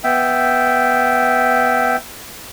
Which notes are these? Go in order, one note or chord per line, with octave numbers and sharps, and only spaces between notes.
B3 E5 G5